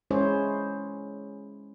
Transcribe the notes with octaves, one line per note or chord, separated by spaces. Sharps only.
G#3 C#4 E4 G#4 C5 C#5